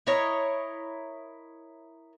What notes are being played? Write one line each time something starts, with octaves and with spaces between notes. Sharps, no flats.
E4 A#4 C#5 D#5